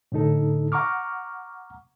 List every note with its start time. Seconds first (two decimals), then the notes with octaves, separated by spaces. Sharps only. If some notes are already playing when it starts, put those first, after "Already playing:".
0.12 A2 D3 D#4 A4
0.72 F#5 A#5 C#6 D6 F6